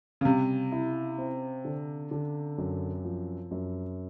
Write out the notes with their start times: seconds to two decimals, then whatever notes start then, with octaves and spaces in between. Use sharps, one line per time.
0.21 C#3
0.25 C3 G3
0.72 E4
1.18 C4
1.65 D3
2.11 D3
2.58 F#2
3.04 F3
3.51 F#2